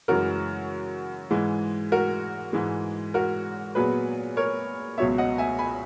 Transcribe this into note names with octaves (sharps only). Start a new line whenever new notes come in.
F#2 C#3 E3 G#3 F#4 A#4
G#2 E3 G#3
F#4 A#4
G#2 E3 G#3
F#4 A#4
A#2 F#3 B3 G#4 B4
A#4 C#5
C#2 B2 F#3 B3 C#5 E5
D#5 F#5
E5 G#5
G#5 B5